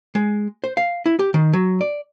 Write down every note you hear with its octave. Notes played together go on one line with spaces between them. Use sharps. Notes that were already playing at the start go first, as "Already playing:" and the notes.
G#3
C5
F5
E4
G4
D#3
F#3
D5